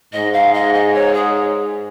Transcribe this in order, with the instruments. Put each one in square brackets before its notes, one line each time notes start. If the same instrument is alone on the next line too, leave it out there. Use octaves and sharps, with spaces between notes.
[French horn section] G#2 [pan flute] D#5
[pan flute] F5
D#5
D#5
C#5
G#4